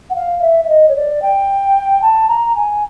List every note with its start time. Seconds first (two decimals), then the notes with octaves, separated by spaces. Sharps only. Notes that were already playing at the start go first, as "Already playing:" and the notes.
0.10 F#5
0.15 F5
0.41 E5
0.65 E5
0.68 D#5
0.88 C#5
0.96 D5
1.22 G5
2.02 A5
2.28 A#5
2.55 G#5